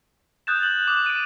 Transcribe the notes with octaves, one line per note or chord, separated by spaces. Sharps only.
D#6 F#6 G6 A6 E7
F#7
D6 D#6 F7
D7 D#7